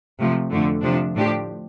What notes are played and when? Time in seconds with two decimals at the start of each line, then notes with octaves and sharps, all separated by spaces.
0.20 C3 F3 A3
0.52 F2 D3 A3
0.83 C3 F3 D4
1.15 A2 F3 D4 G4